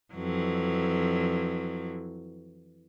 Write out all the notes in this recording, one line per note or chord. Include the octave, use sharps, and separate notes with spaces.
F2 E3 F#3